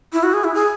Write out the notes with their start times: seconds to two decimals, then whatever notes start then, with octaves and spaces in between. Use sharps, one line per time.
0.13 E4
0.23 F#4
0.33 G#4
0.44 E4
0.54 G#4